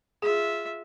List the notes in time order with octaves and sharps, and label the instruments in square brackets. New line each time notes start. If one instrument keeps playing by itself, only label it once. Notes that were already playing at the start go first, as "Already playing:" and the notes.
[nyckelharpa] F4 E5 [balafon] G#4